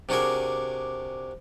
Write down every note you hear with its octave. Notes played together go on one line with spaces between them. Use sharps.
C3 D4 F#4 G#4 A#4